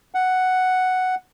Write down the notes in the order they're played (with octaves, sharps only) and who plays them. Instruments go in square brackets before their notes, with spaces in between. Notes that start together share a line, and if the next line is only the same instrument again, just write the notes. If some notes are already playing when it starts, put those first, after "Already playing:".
[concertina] F#5